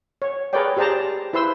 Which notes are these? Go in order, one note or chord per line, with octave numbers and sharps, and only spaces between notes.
C#5
G#4 A#4 B4 C#5 D5 G5
G4 G#4 C5 D5 A5 A#5
E4 B4 C5 C6 E6